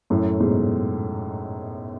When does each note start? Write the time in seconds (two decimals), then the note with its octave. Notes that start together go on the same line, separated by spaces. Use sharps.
0.10 F#2 A2
0.40 G#2 B2